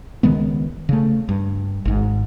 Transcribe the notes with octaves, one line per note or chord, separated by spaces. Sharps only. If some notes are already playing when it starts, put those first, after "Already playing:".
C#2 D#3 G#3 B3
C#3 A3
G2
G#1 G#2